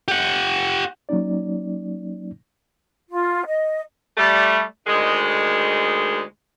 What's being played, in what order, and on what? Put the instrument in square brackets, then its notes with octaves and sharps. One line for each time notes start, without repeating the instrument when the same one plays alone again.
[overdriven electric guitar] G4 F#5
[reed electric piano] F#3 A#3 C#4 D#4 D5
[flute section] F4
D#5
[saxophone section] G3 A3
D2 D#3 G#3